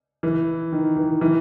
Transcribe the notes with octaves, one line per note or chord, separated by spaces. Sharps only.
E3
D#3
E3
E3